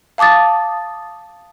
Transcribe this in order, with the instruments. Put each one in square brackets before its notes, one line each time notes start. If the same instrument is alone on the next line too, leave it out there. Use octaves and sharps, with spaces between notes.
[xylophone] F5 A5 D6 D#6 A6